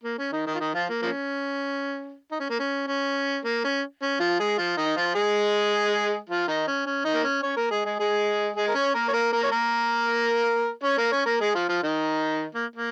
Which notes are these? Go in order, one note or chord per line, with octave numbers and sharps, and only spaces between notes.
A#3
C#4
D#3 D#4
D#3 D#4
F4
D#3 D#4
F3 F4
A#3
F3 A#3 C#4
D#4
C#4
A#3
C#4
C#4
A#3
C#4
C#4
F3 F4
G#3 G#4
F3 F4
D#3 D#4
F3 F4
G#3 G#4
F3 F4
D#3 D#4
C#4
C#4
D#3 D#4
A#3
C#4
C#4 C#5
A#3 A#4
G#3 G#4
G#3 G#4
G#3 G#4
G#3 G#4
A#4
C#4 C#5
A#3 A#4
C#5
A#3 A#4
A#3 A#4
C#5
A#3 A#4
C#4 C#5
A#3 A#4
C#4 C#5
A#3 A#4
G#3 G#4
F3 F4
F3 F4
D#3 D#4
A#3
A#3